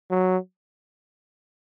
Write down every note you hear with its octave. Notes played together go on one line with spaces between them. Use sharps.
F#3